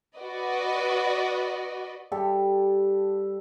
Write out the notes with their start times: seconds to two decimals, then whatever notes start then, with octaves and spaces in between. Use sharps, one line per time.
0.17 F#4 B4 D5 D#5
2.12 G3 G4 A4